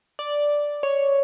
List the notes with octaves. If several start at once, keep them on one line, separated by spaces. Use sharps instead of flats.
D5
C#5